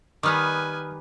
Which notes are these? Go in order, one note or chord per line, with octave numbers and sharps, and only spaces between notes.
D#3 G3 B3 B4 G#5 D6 D#6 F6